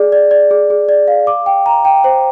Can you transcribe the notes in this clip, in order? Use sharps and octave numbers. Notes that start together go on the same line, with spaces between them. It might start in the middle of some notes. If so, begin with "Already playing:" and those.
Already playing: G#4 D5
D5
D5
G#4
G#4
D5
F5
D6
G5
A#5
G5
C5